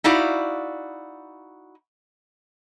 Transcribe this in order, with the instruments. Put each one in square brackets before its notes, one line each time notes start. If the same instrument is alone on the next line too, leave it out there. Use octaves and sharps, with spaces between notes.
[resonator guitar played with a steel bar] D#4 E4 F#4 D5 F5